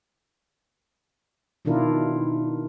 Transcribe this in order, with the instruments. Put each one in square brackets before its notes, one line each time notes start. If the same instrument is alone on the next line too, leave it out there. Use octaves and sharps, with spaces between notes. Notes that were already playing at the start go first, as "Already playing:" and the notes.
[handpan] B2 D#3 D4 E4 F4 A#4